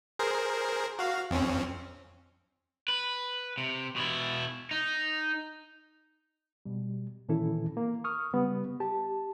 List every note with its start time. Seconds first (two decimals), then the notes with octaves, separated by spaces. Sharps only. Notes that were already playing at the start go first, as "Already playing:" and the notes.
0.19 G#4 A#4 C5
0.99 F#4 F5
1.31 F2 C4 C#4
2.88 B4
3.58 C3
3.96 B2 E4
4.71 D#4
6.66 B2 G3
7.29 A#2 D#3 E3 C#4 E4 A4
7.77 A#3
8.04 C#6 D#6 F6
8.33 C#3 G3 B3
8.80 G4 A5